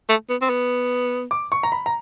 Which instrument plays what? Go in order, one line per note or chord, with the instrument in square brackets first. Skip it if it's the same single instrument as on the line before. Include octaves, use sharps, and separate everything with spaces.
[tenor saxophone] A3
B3
C4
B3
[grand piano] D6
C#6
A#5
B5
A#5